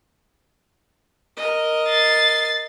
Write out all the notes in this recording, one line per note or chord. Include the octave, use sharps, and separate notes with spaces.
A#4 D#5
A6 C7